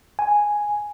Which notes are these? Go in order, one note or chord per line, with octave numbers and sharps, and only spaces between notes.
G#5